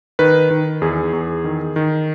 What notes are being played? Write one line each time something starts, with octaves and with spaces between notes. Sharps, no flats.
D#3 B4
D#3
E2 G#4
E2
D#3
D#3